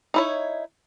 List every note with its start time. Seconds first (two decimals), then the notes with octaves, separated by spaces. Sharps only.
0.14 D#4 E4 C#5